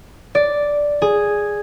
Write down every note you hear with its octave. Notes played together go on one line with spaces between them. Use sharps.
D5
G#4